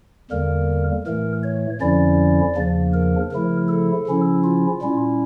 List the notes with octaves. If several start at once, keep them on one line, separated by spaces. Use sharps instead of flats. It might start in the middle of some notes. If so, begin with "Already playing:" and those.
E2 D3 G3 A#3 A#4
A2 E3 A3 A#4
C#5
F2 D3 F3 C#4 E4 D5
E2 C#3 F3 A#3 D4
A#4
C#3 F3 A3 E4 A#4
A4
C#3 F3 C#4 E4
F4
A#2 G3 C#4 E4